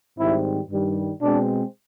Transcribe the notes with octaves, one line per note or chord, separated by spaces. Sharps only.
G#2 D#3 G3 C4 E4
G2 D#3 G3
B2 G#3 C4 D4